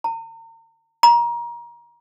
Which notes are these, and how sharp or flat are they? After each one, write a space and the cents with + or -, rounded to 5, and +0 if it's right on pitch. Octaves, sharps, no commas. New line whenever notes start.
A#5 -40
A#5 +25